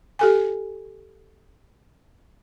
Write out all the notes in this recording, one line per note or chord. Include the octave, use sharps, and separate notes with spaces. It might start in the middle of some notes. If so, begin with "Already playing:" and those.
G4 A4 G#5